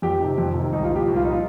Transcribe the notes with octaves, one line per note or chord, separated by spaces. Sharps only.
F2 G4
C3 D#3
F2
C3 D#3
C2 D#4
F4
A#2 F3
G4
C2
F4
A#2 F3 D#4
F4